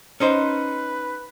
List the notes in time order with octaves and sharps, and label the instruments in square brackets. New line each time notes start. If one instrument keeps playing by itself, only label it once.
[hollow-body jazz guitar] C#4 D#4 C5 [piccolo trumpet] B4